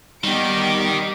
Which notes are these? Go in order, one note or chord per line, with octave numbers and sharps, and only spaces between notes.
D#3 G3 B3 D#4 G4 D7